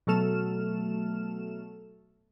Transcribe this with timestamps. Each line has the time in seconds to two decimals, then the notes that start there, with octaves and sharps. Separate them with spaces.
0.07 B2 F#3 A3 A4 F6 E7